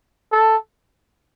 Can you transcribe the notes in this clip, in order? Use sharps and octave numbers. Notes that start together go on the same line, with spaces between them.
A4